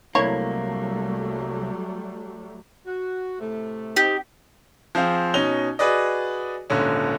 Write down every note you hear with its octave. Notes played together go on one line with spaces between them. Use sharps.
C2 F#3 G3 A3 A#3 E4 C#5
F#4
A2 C3 A3
C4 D#4 G4
F3 C4 G#4 F5
B2 C#4 D#4 F7 G7
F#4 G#4 B4 D5 D#5
D#1 G#2 D3 C#4